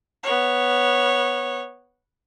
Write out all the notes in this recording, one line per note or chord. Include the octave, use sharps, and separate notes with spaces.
B3 C#5